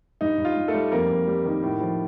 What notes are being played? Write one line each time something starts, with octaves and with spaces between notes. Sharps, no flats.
G2 D#4
G2
F4
G2
A3 A4
G3
F2 A#3 A#4
F2
G3
D#3
A2
F3